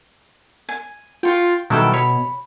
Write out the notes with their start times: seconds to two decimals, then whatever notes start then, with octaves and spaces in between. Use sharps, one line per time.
0.69 G#5
1.23 F4 G5 C#6
1.70 B2 D#3 F#3 G3 E4 A4 G5
1.94 C#5 B5